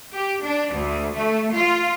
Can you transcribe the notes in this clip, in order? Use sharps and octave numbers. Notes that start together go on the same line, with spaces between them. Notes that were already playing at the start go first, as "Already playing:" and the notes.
G4
D4
D2
A3
F4